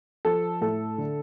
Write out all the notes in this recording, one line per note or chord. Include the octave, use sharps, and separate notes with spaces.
F3 A4
A2 A4
D3